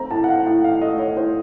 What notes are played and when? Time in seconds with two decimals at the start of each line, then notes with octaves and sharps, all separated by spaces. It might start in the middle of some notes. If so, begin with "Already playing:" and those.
Already playing: A3 C4 A#5
0.11 A2 A5
0.24 F#5
0.29 F5
0.46 A2
0.64 F5
0.81 A3 D#5
0.99 C#5
1.16 A2 C5